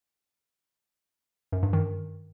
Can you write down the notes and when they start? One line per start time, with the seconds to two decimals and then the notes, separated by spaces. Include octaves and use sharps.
1.52 F#2
1.63 G2
1.73 D#3